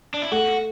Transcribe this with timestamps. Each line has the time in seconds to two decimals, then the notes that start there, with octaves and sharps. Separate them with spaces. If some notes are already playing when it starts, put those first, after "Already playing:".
0.14 D4
0.22 E4
0.32 A3 F#4